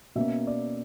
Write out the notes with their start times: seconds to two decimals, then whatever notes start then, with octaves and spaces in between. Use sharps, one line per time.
0.16 B2 A#3 C#4 E5
0.47 D5